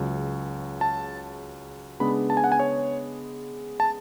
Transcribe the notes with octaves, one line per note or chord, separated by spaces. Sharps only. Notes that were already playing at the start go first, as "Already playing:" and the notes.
Already playing: C#2 C#3 F#3
A5
C#3 G#3 B3 D4 B5
A5
G#5
F#5
G#5
C#5
A5